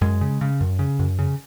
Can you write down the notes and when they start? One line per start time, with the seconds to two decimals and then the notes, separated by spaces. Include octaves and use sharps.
0.01 F#2 G#3
0.21 C#3
0.41 C#3
0.61 F#2
0.79 C#3
0.99 F#2
1.19 C#3